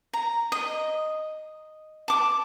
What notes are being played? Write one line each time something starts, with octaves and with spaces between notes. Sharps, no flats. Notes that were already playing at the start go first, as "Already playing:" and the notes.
A#5
D#5
A5 D6